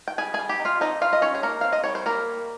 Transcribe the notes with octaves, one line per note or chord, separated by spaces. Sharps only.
G5
G3 G#4 G#5
G3 G#4 G#5
G4 G5
D#4
F4 F5
C4 D#4 D#5
G3 F4 F5
D#5
G3 C#4 C#5
G#4
A#3 D#4 A#4
C4 F5
D#5
G3 C#5
C5
G3 A#3 A#4